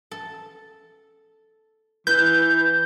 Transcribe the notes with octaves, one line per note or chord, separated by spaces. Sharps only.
A4
E3 B4 G6